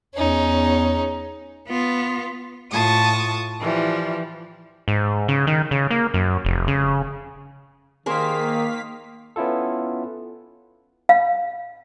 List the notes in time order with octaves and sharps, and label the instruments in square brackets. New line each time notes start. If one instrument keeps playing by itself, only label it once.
[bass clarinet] E2 [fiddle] C#4 D#4
[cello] B3 F4
[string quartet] A2 F4 A5 C#6 D#6
E3 F3 G3
[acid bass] G#2
C#3
D#3
C#3
A#3
F#2
F1
C#3
[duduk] D#3 [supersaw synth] A#3 F5 B6 [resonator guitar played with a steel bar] G#4 A#4 C5
[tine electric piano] B3 C#4 E4 F4 A4
[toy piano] F5